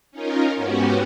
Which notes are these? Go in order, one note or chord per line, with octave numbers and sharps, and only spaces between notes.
C#4 D#4 F4 A#4
G#2 B3 C#4 F#4 G4